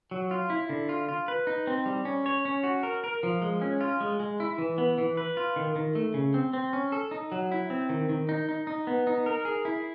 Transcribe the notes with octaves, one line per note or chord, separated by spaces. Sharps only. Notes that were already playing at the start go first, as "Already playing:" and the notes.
F#3
F4
E4
D3
F4
F4
B4
D#4
C4
G3
C#4
C#5
C#4
F#4
A#4
A#4
F3
G#3
C#4
F4
G#3
G#3
E4
E3
B3
E3
B4
F4
D#3
D#3
A3
C#3
C4
C4
C#4
A4
D#4
F#3
E4
C4
D#3
D#3
D#4
D#4
D#4
B3
D#4
A#4
G#4
E4